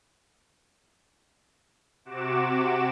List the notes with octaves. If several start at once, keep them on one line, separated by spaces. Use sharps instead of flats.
C3 F#4 D6 E7